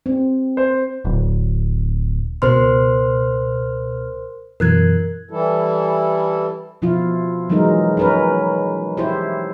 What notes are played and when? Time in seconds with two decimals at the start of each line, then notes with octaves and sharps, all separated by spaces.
0.06 C4
0.57 C5
1.05 D1
2.42 C#2 B2 A#4 C5 C6 F6
4.60 F#2 B2 E3 A#4 F#6 G#6
5.31 E3 G3 E4 A4
6.82 B2 F3 E4 F4
7.50 E3 F#3 G#3 D#4 A#4
7.97 C#4 A#4 B4
8.97 E4 G4 C5